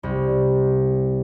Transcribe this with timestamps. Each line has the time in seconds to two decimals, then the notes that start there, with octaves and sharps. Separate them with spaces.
0.03 C2